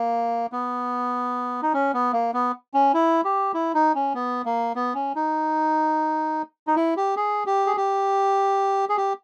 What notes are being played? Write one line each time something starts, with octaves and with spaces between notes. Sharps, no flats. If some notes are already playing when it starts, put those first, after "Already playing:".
Already playing: A#3
B3
D#4
C#4
B3
A#3
B3
C#4
E4
G4
E4
D#4
C#4
B3
A#3
B3
C#4
D#4
D#4
E4
G4
G#4
G4
G#4
G4
G#4
G4